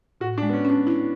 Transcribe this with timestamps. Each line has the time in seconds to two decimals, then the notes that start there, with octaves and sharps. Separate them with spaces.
0.21 A2 F#4
0.38 D4
0.42 G#3
0.49 B3
0.53 C#4
0.65 C#4 D4
0.87 E4